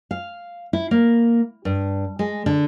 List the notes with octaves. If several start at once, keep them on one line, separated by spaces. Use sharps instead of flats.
F5
E4
A#3
G2
G#3
D3